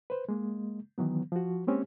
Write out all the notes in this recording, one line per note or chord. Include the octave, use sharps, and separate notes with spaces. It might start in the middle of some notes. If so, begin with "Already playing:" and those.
B4 C5
G#3 A#3
D#3 E3 F#3 B3
F3 F#4
G#3 A#3 C4 C#4 G4